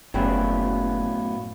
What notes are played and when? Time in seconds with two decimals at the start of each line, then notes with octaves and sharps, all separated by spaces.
0.14 F#1 F#2 A2 G3 B3 C4 F5 B5